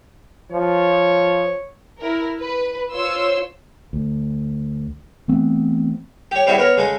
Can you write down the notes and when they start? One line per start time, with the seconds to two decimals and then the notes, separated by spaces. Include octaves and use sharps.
0.52 F3 C#5
1.99 E4 A#4
2.39 B4
2.94 F4 C5 C#5 C6 E6
3.93 D2
5.28 E3 A3 B3 C4
6.31 G4 C#5
6.46 G3 C4 E4 F#4 G#4 F#5
6.58 B3 A#4 C#5
6.77 C#3 G#3 A4